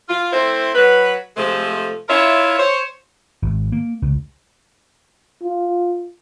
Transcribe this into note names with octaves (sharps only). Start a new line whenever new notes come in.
F4
A3 C4 E4 C5
F#3 B4
C3 F3 G#3 A3
E4 F4 A#4 C#5 E5
C5 C#5
G#1
A#3
C#2
F4